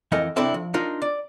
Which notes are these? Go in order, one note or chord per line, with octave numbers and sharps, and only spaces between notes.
F2 E3 A4 A#4 D#5 G#5
C2 C4 D4 E4 A4 E5
F3
D4 D#4 F4 A#4
D5